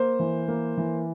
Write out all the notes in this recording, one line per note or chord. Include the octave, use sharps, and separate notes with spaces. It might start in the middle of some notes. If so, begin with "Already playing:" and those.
Already playing: A#3 C5
E3
A#3
E3